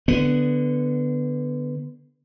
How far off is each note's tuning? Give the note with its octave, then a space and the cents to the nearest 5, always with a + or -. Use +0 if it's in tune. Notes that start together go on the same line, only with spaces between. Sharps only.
D3 +0 B3 +0